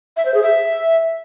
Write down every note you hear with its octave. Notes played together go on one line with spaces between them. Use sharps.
E5
C5
G#4
E5